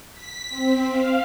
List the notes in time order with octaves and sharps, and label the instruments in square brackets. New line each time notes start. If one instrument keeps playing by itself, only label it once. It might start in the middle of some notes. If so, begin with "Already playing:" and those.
[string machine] B6
C4
F5